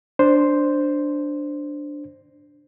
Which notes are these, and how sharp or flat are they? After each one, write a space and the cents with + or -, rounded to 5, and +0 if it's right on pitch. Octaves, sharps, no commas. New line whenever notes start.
D4 +0 C5 +0